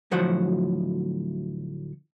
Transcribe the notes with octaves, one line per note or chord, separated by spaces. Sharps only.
D2 A2 F3 F#3 C5 F#5